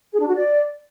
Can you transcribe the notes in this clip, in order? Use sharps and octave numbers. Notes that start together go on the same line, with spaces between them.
G#4
D4
F#4
D5